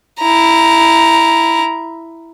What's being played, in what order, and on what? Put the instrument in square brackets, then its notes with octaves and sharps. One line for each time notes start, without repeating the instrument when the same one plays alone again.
[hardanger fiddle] E4 A#5